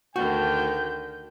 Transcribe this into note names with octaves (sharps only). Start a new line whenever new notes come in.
D2 D3 D#3 F#4 G5 G6